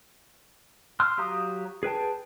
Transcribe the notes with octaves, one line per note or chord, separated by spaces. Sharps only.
C6 E6 F6
F#3 G4 F5 A#5 D#6
G#4 B4 G5 A5